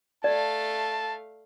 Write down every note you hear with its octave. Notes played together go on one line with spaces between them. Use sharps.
A3 D5 F5 A5